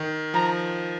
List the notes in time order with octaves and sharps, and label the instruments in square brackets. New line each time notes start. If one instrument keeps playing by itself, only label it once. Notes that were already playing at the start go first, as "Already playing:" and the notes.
Already playing: [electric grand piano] D#3
[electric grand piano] F3 [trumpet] A#5